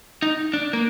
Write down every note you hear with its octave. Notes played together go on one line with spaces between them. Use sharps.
D#4
D4
A#3